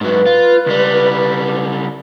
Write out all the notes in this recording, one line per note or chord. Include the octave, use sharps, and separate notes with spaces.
G#2 F#3 B4
F4
C#2 G3